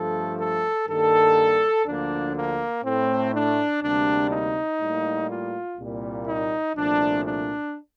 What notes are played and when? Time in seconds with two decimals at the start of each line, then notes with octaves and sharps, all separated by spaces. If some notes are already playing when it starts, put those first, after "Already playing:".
Already playing: G2 F3 A3 A4
0.40 A4
0.88 G2 D#3 G3 A#3 A4
1.86 D2 D3 F3 A#3 D4
2.36 A#3
2.84 A2 A3 C4
3.34 D4
3.82 D2 C3 G3 A#3 D4
4.31 D#4
4.80 A2 G3 A#3
5.30 F4
5.78 C2 A#2 G3 A#3
6.28 D#4
6.77 C2 A#2 F3 A3 D4
7.25 D4